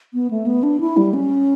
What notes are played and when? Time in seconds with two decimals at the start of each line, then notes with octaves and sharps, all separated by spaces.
0.14 B3
0.31 A3
0.46 B3
0.63 D4
0.80 E4
0.97 G3
1.13 C#4